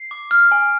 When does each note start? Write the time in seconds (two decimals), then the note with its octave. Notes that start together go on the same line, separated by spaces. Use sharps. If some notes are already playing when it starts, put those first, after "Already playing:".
Already playing: C7
0.11 D6
0.31 F6
0.52 G#5